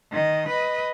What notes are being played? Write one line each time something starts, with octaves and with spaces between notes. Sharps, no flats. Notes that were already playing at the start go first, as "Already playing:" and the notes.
D#3 D#5
B4 D#5